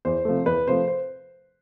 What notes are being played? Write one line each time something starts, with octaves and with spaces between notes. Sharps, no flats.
E2 C5
C3 F3 A3
E2 B4
C3 F3 A3 C5
C5